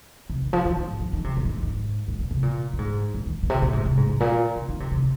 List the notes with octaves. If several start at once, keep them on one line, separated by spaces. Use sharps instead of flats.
C3
D#3
F3
D#3
D#3
G#2
F3
D#3
C3
A#2
G#2
G#2
A#2
A#2
C3
A#2
A#2
G#2
A#2
D#3
A#2
C3
A#2
G#2
C3
G#2
G#2
A#2
C3
D#3
C3
C3